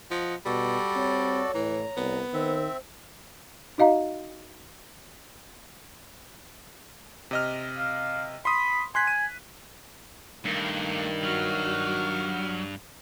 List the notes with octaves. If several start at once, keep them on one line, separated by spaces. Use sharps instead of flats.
F3 D#5 F#5
B2 G3 F#4 A4 D5
C4 C#5
A2 E3 A#5
C2 B3
D#3 C4 C5 E5
D#4 F#4 D#5 F5 A#5
C3 D#5 F6
F5
B5 C6 D#6
G#5 C6 F#6 B6
D#7
G2 D#3 A3 A#3
F#3 F#4 F6